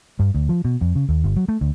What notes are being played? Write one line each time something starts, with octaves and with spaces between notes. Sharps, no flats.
G2
D2
F3
B2
F2
C#3
D#2
G1
F#3
A3
D2